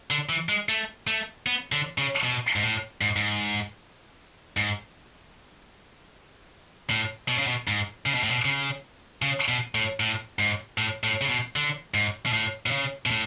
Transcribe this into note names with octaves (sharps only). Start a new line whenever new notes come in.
D3
E3
G#3
A3
A3
B3
D3
C#3
B2
G#2
A2
G#2
G#2
G#2
A2
B2
C#3
B2
G#2
C#3
B2
A2
B2
C#3
C#3
B2
A2
A2
G#2
A2
A2
C#3
B2
D3
G#2
B2
A2
B2
C#3
B2
A2